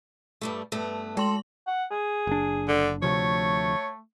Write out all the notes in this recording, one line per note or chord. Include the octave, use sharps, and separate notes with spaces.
G2 G3 A3
G2 A3 B3
G#3 A4 C6 F#7
F#5
G#4
F#1 D4
D3
D2 C3 F3 A3 C#5